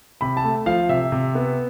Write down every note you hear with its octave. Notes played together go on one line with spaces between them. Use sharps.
C3 B5
A5
A3
F3 F5
C3 E5
C3
B3